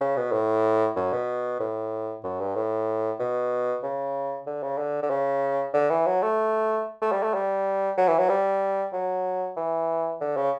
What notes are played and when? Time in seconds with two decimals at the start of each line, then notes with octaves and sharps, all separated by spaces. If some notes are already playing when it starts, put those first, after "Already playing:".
0.01 C#3
0.17 B2
0.32 A2
0.96 F#2
1.13 B2
1.60 A2
2.24 F#2
2.40 G2
2.56 A2
3.19 B2
3.83 C#3
4.46 D3
4.63 C#3
4.78 D3
5.02 D3
5.10 C#3
5.74 D3
5.90 E3
6.06 F#3
6.22 A3
7.02 A3
7.12 G3
7.23 A3
7.34 G3
7.97 F#3
8.08 E3
8.18 F#3
8.29 G3
8.93 F#3
9.57 E3
10.21 D3
10.37 C#3